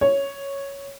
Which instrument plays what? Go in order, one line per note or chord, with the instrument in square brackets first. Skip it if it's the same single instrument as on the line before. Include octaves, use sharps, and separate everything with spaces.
[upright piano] C#5